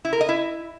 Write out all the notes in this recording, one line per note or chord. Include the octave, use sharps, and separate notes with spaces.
E4
A#4
D#5
E4